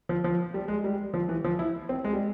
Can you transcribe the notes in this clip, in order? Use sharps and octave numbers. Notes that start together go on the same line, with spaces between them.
F3
F3
G3
G#3
G3
F3
E3
F3
E4
C4
G#3
G3